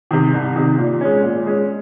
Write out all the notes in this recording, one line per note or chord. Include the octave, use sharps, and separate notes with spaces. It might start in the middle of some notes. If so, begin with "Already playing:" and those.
C3 D#3
C2
C3 D#3
A#2
G#3 C#4
A#2
G#3 C#4